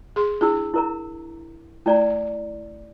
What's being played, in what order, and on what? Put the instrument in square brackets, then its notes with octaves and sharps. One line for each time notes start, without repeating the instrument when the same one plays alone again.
[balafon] G#4 C6
[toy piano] D4 E4 E6 [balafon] G#4
[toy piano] E4 A#4 A#5
[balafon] A3 [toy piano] E4 D5 A#5